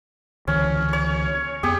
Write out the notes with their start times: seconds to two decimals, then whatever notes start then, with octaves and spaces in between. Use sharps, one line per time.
0.47 C#2 D3 E3 C#4
0.93 C#5
1.63 F2 B3 G4 G#4